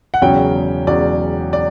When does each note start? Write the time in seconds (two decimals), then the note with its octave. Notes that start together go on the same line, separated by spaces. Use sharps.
0.14 F#5
0.21 E1 E2 C#3 F#3 C#4 G5
0.87 E1 E2 C#3 F#3 C#4 D5
1.53 D5